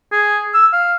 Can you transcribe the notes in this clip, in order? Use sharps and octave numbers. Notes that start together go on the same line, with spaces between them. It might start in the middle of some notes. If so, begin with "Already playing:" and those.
G#4
E6
F5